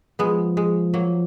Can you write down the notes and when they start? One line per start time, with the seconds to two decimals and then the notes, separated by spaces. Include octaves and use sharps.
0.19 F3 G#3 B3
0.57 G#3
0.94 F#3 A#3